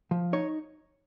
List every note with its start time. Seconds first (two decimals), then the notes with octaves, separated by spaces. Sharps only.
0.11 F3
0.33 D#4 C#5